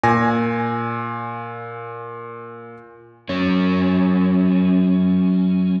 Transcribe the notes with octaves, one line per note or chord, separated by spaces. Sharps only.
A#2 G#5 A#6
F#3 C#4